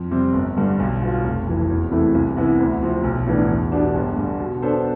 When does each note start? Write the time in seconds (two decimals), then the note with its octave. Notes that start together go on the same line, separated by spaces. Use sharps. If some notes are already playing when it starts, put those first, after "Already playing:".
Already playing: F2
0.11 C3 G3 C4
0.33 G1
0.56 G2 D3 G3
0.79 B1
1.01 B2 B3 F4
1.23 F1
1.47 F2 E3
1.70 E2
1.91 C3 E3 A3 E4
2.15 C2
2.37 C3 E3 B3 E4
2.59 D2
2.82 C3 F3 C4
3.04 B1
3.26 A2 E3 B3 D4
3.49 E2
3.72 B2 B3 D4 G4
3.95 G1
4.16 G2 D3
4.39 B2
4.62 B3 D4 A4 C5